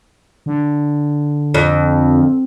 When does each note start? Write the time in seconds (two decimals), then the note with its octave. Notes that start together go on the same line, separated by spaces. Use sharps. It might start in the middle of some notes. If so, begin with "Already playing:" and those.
0.46 D3
1.54 F2